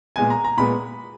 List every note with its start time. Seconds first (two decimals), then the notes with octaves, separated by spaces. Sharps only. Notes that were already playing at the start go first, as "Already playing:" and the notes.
0.16 A#2 G#3 B3 G#5
0.30 A#5
0.44 A#5
0.57 A#2 G#3 B3 B5